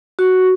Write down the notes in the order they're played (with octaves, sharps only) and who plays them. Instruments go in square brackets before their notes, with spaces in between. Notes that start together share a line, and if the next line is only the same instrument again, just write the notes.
[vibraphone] F#4